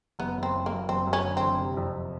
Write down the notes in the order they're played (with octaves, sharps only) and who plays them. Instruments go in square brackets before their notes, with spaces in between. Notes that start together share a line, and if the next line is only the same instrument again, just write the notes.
[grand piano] F#1 [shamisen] B3
[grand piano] F#1
[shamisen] C4
[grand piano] F#1
[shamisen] A#3
[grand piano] F#2
[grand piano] F#1 [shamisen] C4
[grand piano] F#2
[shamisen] C#4
[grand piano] D3
[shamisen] C4
[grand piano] F#1
C3
F2